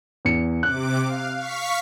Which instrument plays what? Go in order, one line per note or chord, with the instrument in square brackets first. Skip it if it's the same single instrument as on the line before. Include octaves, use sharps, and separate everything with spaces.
[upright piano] E2 C#7
[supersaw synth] C3 D6 [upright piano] F#6
[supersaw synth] F5
F5 C#6 B6